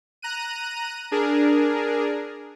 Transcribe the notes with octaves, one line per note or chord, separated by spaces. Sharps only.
A#5 F#6 D#7
D4 G#4 A#4